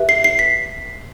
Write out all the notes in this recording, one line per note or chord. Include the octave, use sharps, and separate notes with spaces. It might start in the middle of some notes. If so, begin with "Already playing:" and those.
Already playing: G4 B4 E5
C7
C7
B6